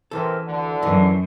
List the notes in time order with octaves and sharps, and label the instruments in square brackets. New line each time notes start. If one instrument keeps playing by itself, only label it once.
[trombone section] C3 A#4 C5 [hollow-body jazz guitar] E3 A4
[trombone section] D2 D3
[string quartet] F#2 [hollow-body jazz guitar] E3 D#4